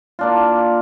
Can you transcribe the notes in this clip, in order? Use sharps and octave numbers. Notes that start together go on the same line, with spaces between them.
A#3 D4 F4